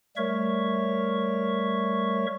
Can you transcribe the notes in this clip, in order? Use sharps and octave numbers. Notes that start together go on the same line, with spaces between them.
G3 A3 A#4 C#5 E5 C#6